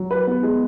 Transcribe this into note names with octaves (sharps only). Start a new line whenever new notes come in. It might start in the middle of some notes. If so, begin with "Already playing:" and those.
Already playing: F#3
B4
B3
G#3